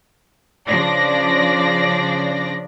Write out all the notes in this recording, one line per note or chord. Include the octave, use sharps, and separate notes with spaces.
C#3 F3 D4 D5 A#6